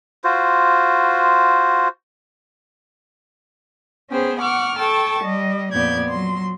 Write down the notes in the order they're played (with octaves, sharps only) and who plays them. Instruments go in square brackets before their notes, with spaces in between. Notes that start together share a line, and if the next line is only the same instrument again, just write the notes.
[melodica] F4 F#4 C5
[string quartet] B3 C#4 G#4 C5 G5
F#5 C#6 D6 F6
A4 G5 A5 C#6
G3 D#5
F2 A#2 B3 D5 G6 G#6
F#3 C6